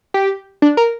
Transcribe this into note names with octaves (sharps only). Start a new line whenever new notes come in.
G4
D4
A#4